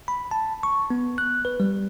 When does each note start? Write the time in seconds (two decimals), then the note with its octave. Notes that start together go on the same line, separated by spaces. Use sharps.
0.08 B5
0.31 A5
0.63 C#6
0.90 B3
1.18 F#6
1.45 B4
1.60 G3